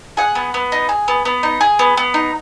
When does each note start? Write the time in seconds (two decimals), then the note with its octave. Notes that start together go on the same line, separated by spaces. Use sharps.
0.17 G#4 F#5
0.35 B3
0.54 B3
0.72 D#4
0.89 G#4
1.08 B3
1.25 B3
1.43 D#4
1.61 G#4
1.79 B3
1.97 B3
2.14 D#4